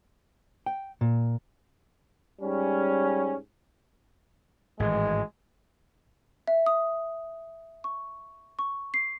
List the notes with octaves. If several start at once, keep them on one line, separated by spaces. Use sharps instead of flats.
G5
A#2
G#2 G3 C#4
G#1 A2 E3 G#3
E5
D#6
C#6
C#6
C7